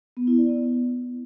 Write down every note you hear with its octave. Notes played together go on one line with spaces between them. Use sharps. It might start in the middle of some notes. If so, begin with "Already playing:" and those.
B3
E4
D5
B3